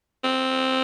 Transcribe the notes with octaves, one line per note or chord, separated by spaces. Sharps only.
C4